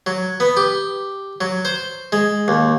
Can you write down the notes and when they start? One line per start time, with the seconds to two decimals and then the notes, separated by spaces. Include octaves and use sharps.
0.06 F#3
0.40 B3
0.57 G4
1.41 F#3
1.65 C5
2.12 G#3
2.48 D#2